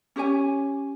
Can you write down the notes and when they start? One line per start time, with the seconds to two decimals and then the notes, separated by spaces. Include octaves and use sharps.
0.16 C#4 G4 C#5 G#5